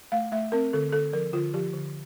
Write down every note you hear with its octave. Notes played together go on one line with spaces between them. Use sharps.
A3 F5
A3 E5
C4 A#4
D3 A4
D3 A4
F3 A#4
D3 F4
F3 G4
D3